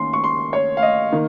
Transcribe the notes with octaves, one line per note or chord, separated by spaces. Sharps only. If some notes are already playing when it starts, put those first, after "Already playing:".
Already playing: D#3 A#3 C#4 C6
C#6
C6
C#5
F5
D#5
D#3 A#3